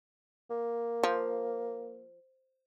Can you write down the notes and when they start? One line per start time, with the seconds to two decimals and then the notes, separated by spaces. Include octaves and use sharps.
0.51 A#3
1.03 F3